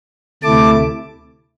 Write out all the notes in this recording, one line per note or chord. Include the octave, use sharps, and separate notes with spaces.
D2 C3 A3 E4 A5 D6